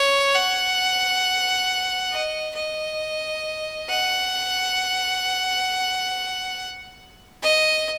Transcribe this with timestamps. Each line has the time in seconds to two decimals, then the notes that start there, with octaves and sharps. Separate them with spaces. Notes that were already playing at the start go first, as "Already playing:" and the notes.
Already playing: C#5
0.35 F#5
2.11 D#5
2.55 D#5
3.89 F#5
7.43 D#5